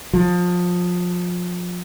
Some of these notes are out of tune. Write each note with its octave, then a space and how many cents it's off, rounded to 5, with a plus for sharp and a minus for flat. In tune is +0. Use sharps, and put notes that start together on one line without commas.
F3 +25